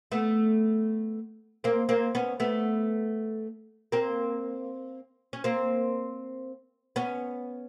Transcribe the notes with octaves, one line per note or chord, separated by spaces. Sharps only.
A3 B3
A#3 C4
A#3 C4
B3 C#4
A3 B3
A#3 C4
C#4
A#3 C4
B3 C#4